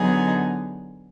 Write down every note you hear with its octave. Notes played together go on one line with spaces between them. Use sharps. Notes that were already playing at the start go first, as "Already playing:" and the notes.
Already playing: D3 F#3 B3 D#4 G#4